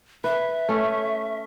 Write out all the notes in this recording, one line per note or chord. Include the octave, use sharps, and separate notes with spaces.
B4 E5
A3 C#4